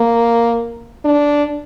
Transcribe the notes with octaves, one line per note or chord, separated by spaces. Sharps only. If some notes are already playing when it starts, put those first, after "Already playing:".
Already playing: A#3
D4